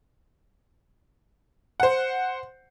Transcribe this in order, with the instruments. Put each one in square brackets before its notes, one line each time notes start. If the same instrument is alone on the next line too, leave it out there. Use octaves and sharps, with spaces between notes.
[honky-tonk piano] C5 F#5